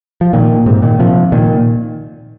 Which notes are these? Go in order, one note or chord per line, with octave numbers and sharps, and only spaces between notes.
F3
A#2 D#3
G#2 C3
A#2 D#3
C3 F3
A#2 D#3